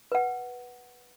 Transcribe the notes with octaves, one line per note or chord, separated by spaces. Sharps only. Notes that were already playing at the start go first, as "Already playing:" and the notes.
B4 F#5